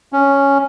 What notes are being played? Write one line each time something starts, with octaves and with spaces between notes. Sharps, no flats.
C#4